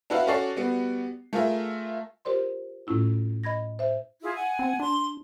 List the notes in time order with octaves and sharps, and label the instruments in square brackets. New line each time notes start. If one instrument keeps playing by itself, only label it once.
[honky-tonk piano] D4 E4 F#4 B4 E5 F5
C#4 F#4 A4 D5 C#6 C7
G3 B3 F#4
A3 F4 G#4 A#4 E5
[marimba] F4 G4 A#4 C5 D5 C6
A2 A3 C#4 E4 F4
D#5 B5 G#6 A#6
C5 E5
[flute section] E4 F4 G#4
F#5 G#5
[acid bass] C4
[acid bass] D4 [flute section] C6